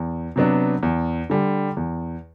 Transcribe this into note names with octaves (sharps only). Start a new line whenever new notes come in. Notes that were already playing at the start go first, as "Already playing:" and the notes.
Already playing: E2
C3 F#3 B3 D4
E2
D3 G3
E2